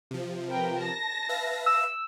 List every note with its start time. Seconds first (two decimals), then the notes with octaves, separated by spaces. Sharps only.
0.11 C3 F3
0.49 A#4 B4 G5
0.80 A5 A#6
1.29 B4 E5 F5
1.66 E6